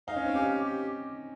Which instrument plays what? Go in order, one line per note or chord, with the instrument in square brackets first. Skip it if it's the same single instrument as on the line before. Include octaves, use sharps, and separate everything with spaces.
[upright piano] D#4 [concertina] F5
[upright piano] C#4
C4
[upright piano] C#4 [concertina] G4
[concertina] G4